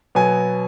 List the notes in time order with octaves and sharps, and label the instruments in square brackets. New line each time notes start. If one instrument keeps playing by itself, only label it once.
[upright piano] B2 F#3 B3 G#5